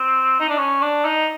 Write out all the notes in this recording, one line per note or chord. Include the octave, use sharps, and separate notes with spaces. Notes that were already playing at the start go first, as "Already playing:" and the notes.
Already playing: C4
D#4
D4
C#4
D4
D#4